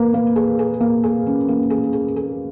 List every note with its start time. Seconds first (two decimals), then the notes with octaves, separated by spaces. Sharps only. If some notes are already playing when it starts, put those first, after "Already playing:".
Already playing: A#3 B4
0.14 A#3
0.36 G#4
0.59 G#4
0.80 A#3
1.03 G#4
1.27 C#4
1.48 A#3
1.70 G#4
1.93 G#4
2.16 G#4